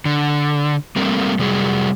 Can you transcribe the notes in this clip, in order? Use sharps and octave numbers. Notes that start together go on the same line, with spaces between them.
D3
G3 A3 A#3 C4
C3 F#3 G3 G#4